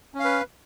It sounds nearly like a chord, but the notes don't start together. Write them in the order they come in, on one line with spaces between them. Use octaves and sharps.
C#4 F5 B4